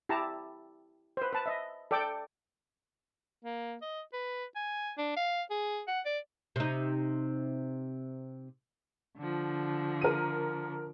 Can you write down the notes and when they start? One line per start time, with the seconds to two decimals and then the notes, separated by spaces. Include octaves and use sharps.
0.09 E4 G4 A5 A#5
1.17 B4 C5
1.33 B4 A5
1.46 D#5 E5
1.91 A4 D5 G5 D6
3.45 A#3
3.82 D#5
4.13 B4
4.56 G#5
4.98 D4
5.17 F5
5.50 G#4
5.88 F#5
6.06 D5
6.56 C3 D#4
9.18 D3 F3
10.01 A#4 D#7